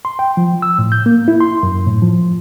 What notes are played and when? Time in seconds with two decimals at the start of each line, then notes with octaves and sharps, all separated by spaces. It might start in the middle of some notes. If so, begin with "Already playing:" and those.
0.05 C6
0.19 G5
0.37 F3
0.62 E6
0.79 A2
0.92 G6
1.06 A#3
1.28 E4
1.40 C6
1.63 F#2
1.87 A2
2.02 F3